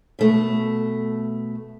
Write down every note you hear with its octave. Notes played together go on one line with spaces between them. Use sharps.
B2 A3